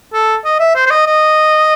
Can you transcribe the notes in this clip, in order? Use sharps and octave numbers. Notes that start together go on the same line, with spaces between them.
A4
D#5
E5
C5
C5
D#5
D#5